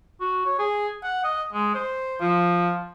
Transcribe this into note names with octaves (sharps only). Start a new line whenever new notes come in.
F#4
C#5
G#4
F#5
D#5
G#3
C5
F3